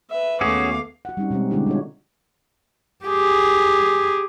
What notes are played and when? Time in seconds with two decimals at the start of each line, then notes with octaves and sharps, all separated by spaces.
0.10 B4 E5
0.41 D#2 A3 B3 C#4 F#4 G#4 F5 D6
1.05 F#4 F#5
1.17 G3 C4 C#4 D#4
1.30 B2 G3 G#3 C4
1.51 D3 G#3 A3 D4 E4 G4
1.66 G3 F4 C#5
3.05 G4 G#4